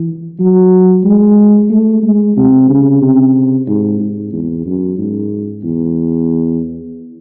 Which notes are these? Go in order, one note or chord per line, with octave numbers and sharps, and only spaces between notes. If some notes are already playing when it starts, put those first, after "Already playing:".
Already playing: E3
F#3
G#3
A3
G#3
C3
C#3
C3
G#2
G#2
E2
F#2
G#2
E2